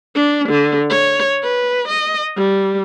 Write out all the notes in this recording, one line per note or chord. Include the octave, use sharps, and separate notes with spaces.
D4
D3
C#5
B4
D#5
G3